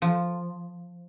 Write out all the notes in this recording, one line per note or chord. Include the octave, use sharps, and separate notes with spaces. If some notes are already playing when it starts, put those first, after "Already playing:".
F3